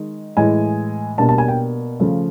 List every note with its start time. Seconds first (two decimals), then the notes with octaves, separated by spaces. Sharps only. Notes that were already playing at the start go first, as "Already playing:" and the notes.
Already playing: D#3 G#3
0.37 A2 E3 G#3 G#5
1.18 B2 G3 A#3 D4 A5
1.29 A5
1.38 G#5
1.48 G5
2.00 C#3 F3 A3